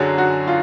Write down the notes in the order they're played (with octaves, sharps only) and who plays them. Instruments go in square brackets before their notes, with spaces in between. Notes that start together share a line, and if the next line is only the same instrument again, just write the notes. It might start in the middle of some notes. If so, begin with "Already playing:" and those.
Already playing: [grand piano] F#2 D3 F#3 [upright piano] G#4
[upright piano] F#4
F4